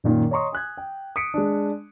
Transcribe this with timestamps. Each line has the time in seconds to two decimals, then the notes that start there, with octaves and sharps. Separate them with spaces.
0.04 F#2 A#2 D#3 A#3
0.31 C#5 D#5 A#5 C6 C#6 D#6
0.52 G#5 F#6 G#6
0.77 G5
1.16 D#6 B6 C#7 D7
1.34 G#3 D4